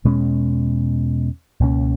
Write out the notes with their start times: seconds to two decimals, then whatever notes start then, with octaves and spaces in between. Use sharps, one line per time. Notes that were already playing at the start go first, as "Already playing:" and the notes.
0.05 E2 B2 G#3 C#4
1.60 C#2 B2 A#3 C#4